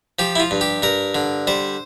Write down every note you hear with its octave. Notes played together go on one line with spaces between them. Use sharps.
F3 G4
E4
F4
G2
G4
G2 A#4
D3
G3 C5